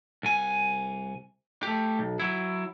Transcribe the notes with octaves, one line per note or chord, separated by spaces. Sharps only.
C2 G#5
A3 G4
B1
F#3 E4